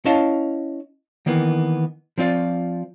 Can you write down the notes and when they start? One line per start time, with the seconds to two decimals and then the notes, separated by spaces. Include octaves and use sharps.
0.05 C#4 E4 D#5 F5 A5
1.26 D#3 E3 A#3 B3
2.18 F3 C4 F4 D5